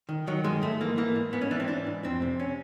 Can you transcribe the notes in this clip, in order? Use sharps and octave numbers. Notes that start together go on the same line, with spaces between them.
D#3
D#3 F#3
G2 G#3
G#2 A3
E3 A#3
E3 A#3
G#2
G#2 B3
C#4
E3 D4
C4
E3 D4
G#2
F2 C4
C3
C#4